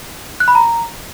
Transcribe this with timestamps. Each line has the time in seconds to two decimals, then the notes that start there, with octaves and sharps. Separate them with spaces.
0.40 F#6
0.48 B5
0.55 A#5